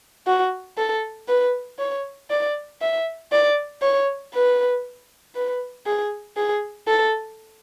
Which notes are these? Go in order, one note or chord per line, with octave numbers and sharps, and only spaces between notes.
F#4
A4
B4
C#5
D5
E5
D5
C#5
B4
B4
G#4
G#4
A4